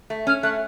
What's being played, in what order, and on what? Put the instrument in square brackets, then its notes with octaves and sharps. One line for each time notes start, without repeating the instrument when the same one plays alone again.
[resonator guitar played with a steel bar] A3
[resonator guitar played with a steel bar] C#4 [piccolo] F6
[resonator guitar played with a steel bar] A3 [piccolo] F#6